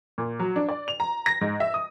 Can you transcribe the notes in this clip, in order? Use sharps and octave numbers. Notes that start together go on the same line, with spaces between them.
A#2
F#3
D4
D5
F7
A#5
A#6
G#2
E5
D#6